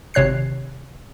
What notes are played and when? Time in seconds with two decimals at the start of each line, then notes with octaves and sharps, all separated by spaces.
0.14 G#1 C3 C#5 F#6 C7